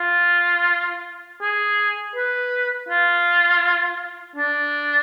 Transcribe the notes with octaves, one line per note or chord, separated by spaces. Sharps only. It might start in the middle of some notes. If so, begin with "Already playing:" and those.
Already playing: F4
G#4
B4
F4
D4